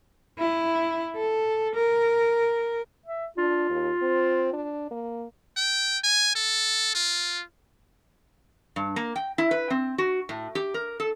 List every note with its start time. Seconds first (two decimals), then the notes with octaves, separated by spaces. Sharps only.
0.39 E4
1.16 A4
1.75 A#4
3.06 E5
3.38 D4 F4
3.70 D#2
4.02 C4
4.54 D4
4.91 A#3
5.57 G5
6.04 G#5
6.35 A4
6.95 F4
8.76 G2
8.96 A#3
9.16 G5
9.38 E4
9.51 B4
9.70 C4
9.98 F#4
10.29 A2
10.55 G4
10.74 A#4
11.00 A4